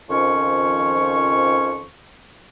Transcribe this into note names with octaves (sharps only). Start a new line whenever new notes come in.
F2 D#3 F3 C#4 C#6